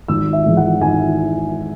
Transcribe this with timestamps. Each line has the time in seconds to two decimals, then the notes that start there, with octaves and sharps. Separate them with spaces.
0.08 G#1 E6
0.33 E5
0.46 G#2 E3
0.57 F#5
0.81 G#1 G#5